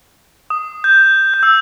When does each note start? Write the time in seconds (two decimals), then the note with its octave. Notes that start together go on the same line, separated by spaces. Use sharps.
0.50 D#6
0.84 G6
1.34 G6
1.43 E6